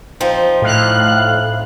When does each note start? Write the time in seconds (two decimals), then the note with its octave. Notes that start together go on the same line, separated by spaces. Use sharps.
0.20 F3 C4 D#4
0.62 A2 F5 F#6